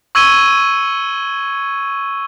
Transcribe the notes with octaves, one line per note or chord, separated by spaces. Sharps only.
C#6 E6 G#6 C#7 D#7 G7